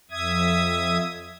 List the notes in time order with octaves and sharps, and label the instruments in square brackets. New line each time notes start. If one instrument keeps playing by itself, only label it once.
[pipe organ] F2 E5 D#6 G#6